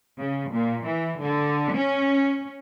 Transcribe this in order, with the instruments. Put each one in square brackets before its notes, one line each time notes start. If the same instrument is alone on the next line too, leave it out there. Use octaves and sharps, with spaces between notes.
[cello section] C#3
A#2
E3
D3
C#4